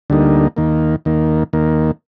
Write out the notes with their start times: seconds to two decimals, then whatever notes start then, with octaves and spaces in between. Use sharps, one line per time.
0.10 D2 D3 G3 A#3 D#4
0.57 D#2 D#3 A#3
1.05 D#2 D#3 A#3
1.53 D#2 D#3 A#3